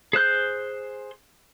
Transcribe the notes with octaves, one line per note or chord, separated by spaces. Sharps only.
G#4 C5 F#6 G6